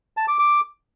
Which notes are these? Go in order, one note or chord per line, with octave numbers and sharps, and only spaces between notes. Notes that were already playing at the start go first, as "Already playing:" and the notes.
A5
D6
D6